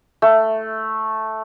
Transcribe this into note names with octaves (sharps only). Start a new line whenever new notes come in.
A3